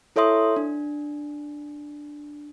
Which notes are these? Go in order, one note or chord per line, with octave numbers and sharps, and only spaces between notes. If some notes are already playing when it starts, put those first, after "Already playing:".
E4 A4 C#5 E5 C6 D#6
D4